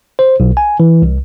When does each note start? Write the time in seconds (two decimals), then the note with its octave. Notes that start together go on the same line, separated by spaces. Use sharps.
0.19 C5
0.40 B1
0.57 G#5
0.80 E3
1.02 C2